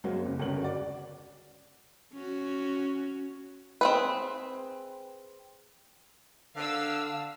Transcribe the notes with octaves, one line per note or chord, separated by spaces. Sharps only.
F#2 F#3 G#3 A#3 C4 F#4
F#1
G1 C#2 A#4 C#5 F#7
F#4 D5
C#4 F#4
C4 G#4 B4
D3 F5 E6